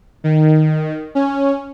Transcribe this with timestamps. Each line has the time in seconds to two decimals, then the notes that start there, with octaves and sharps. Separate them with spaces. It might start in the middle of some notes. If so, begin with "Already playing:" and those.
0.24 D#3
1.15 C#4